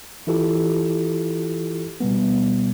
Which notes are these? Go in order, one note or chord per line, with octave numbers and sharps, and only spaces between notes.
E3 E4 F4 G4 A4
B2 G3 B3